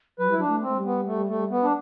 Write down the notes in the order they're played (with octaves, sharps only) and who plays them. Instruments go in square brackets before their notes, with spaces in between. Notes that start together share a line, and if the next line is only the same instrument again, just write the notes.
[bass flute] F#3 [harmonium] B4
[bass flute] G3 [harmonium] E4
[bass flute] F#3
[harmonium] D4
[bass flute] A3
[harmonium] C4
[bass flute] A3
G3
[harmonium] B3
A3
A3
B3
D4